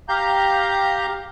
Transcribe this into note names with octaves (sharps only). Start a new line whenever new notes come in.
G4 F5 A#5 G6